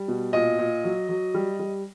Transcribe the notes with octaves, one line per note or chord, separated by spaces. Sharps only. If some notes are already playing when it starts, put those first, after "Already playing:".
Already playing: G3
B2
A#2 D#5
A#2
F#3
F#3
G3
G3